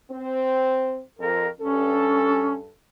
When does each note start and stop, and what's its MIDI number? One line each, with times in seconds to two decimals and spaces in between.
0.11 1.02 60
1.19 1.47 41
1.19 1.48 70
1.60 2.73 43
1.60 2.56 61
1.60 2.73 69